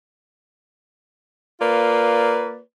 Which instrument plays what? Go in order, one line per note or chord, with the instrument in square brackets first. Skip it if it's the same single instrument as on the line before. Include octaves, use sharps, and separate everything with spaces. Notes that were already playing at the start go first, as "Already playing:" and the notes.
[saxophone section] A#3 F4 B4 D5